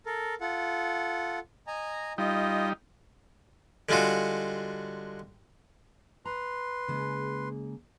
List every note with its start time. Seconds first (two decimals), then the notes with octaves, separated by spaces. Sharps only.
0.06 A4 A#4
0.41 F4 A4 F#5
1.67 D#5 G#5 A#5
2.18 G3 D#4 F4 D#5
3.89 D3 G3 G#3 F4 F#4
6.25 B4 A#5 C6
6.88 C#3 G#3 A#3